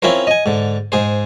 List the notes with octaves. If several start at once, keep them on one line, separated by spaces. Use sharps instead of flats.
C4 C#4 E4 F4 A#4 C5
D#5 G#5
G#2 D3
G#2 G#4 C5